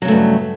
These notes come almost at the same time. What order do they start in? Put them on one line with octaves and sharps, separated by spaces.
F#3 C#3 A3 G2 B3